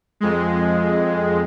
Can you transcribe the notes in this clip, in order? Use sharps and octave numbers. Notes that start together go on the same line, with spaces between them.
F2 G#3